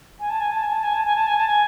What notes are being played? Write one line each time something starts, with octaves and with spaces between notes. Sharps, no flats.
G#5
A5
G#5
A5
G#5
A5
G#5
A5
G#5
A5
G#5
A5
G#5